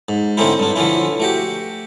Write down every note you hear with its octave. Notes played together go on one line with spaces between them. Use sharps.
G#2
D3 A3 C4 C#4 D#4 E4
G2 D4
D3 E3 F3 C#4 E4
A3 F#4 G4